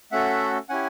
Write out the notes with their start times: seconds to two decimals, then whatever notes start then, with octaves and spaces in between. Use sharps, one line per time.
0.12 A3 C#4 F#4 A4 E5 F#5
0.69 C#4 E4 G4 F#5 G#5